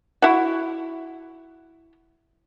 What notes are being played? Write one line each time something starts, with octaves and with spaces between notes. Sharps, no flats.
E4 F#4